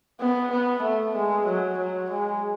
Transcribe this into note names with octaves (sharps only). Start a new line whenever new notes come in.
B3
B3
A3
G#3
F#3
F#3
G#3